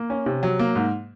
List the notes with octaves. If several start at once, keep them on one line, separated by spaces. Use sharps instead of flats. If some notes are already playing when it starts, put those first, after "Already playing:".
Already playing: A#3
C#4
C3
F#3
A#3
G#2